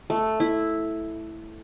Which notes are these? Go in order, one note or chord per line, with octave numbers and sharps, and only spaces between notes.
A3
E4